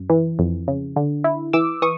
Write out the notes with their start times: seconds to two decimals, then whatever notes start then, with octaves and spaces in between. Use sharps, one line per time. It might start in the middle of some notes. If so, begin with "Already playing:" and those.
Already playing: F#2
0.10 E3
0.39 F2
0.68 C#3
0.96 D3
1.24 E4
1.53 E3 D6 E6
1.82 E3 C#6 D#6